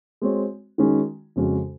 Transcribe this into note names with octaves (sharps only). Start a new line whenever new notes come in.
G#3 C4 F#4 C#5
D#3 G#3 C#4 F#4
F2 C#3 G#3 C#4 F#4